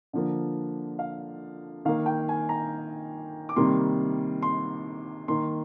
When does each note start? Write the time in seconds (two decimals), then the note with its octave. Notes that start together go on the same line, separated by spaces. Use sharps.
0.13 D3 F3 A#3
0.99 F5
1.85 D#3 A#3 F5
2.06 G5
2.29 G#5
2.49 A#5
3.49 D6
3.56 C3 D#3 G3 A#3 C6
4.42 C6
5.28 D#3 A#3 C6